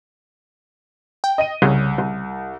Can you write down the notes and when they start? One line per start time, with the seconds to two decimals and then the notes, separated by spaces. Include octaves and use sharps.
1.24 G5
1.38 D#5 D#7
1.62 C2 C#3
1.98 C2